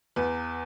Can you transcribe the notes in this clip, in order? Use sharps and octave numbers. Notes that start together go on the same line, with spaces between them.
E2 B4